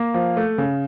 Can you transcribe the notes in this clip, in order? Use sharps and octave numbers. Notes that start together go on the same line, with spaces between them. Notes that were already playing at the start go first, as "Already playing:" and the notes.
Already playing: A#3 F5
F3
A3
C#3